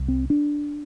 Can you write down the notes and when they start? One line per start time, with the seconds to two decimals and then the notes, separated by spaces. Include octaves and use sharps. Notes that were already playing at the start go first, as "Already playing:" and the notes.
Already playing: C2
0.08 C4
0.30 D4